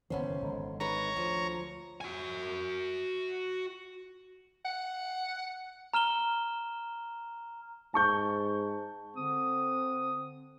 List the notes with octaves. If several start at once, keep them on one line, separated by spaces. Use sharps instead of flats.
F#1 D#3 E3 B3 C#4 C5
G#1 D3 G#3
D#4 B4 C#5 A#5
D2 F3
F#4 G#5
F#5
A#5 F6 E7 G7
G#2 A5 C#6 G6
D3 C4 D#6